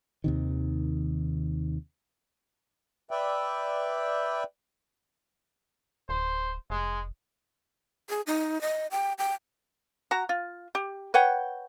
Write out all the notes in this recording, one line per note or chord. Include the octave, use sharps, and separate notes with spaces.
D#2 C3 D#3
B4 D5 E5 G5
D1 C5
F1 G#3
G#4
D#4
D#5
G5
G5
F#4 A#5
F4
G4
B4 C#5 F#5 G5